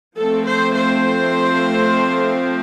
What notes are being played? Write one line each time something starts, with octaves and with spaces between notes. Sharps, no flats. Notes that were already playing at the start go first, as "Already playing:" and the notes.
F3 A3 C4 A4
C5
C5